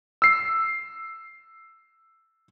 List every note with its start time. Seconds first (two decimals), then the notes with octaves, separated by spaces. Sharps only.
0.22 E6 C7